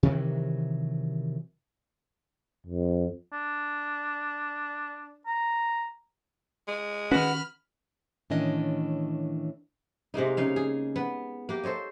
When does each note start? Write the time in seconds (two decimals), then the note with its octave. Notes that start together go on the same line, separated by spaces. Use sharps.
0.03 C3 D#3 E3 F#3
2.66 F2
3.32 D4
5.27 A#5
6.68 G#3
7.11 D#3 C#4 F#4 B4 B5 F6
8.30 A2 D#3 E3 C#4 D4 D#5
10.14 C3 G#3 A#3 D#4
10.37 C#3 D#4 F5
10.56 G#4
10.96 B3
11.49 A#3 G4
11.64 A4 C5 C#5 D#5